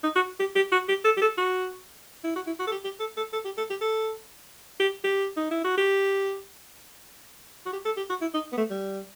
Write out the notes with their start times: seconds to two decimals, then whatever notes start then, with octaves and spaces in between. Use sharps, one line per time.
0.03 D#4
0.16 F#4
0.40 G4
0.56 G4
0.72 F#4
0.88 G4
1.05 A4
1.17 G4
1.21 A4
1.38 F#4
2.24 E4
2.36 F#4
2.47 E4
2.59 F#4
2.67 A4
2.71 G4
2.84 G4
3.00 A4
3.17 A4
3.33 A4
3.45 G4
3.58 A4
3.70 G4
3.81 A4
4.80 G4
5.04 G4
5.37 D#4
5.51 E4
5.64 F#4
5.78 G4
7.66 F#4
7.73 G4
7.85 A4
7.97 G4
8.10 F#4
8.21 E4
8.34 D#4
8.52 B3
8.57 A3
8.70 G3